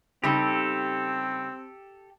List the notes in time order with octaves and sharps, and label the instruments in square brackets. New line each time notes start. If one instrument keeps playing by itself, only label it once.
[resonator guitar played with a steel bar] C#3 G3 D#4 [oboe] C4 [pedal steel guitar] G4 A4